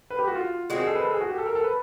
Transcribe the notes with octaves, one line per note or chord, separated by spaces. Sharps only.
B4
G4
F#4
F4
D#3 G#3 C4 F#4
G#4
A4
B4
A4
G#4
F#4
G4
A4
A#4
A4
B4